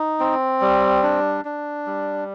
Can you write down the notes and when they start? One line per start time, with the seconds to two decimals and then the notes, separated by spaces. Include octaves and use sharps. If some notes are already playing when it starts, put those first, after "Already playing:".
Already playing: D#4
0.20 C4
0.61 G3
1.03 D4
1.45 D4
1.87 G3